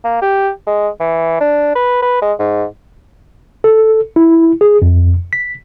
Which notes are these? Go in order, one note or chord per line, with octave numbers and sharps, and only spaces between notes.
A#3
G4
G#3
E3
D4
B4
B4
G#3
G#2
A4
E4
G#4
F2
B6